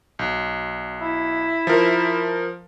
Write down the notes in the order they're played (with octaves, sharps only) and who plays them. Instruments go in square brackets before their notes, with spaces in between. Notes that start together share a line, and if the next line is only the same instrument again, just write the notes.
[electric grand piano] B1
[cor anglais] E4
[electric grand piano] F3 A#4